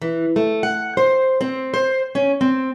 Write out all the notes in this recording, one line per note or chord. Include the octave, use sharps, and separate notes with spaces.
E3
A3
F#5
C5
C4
C5
C#4
C4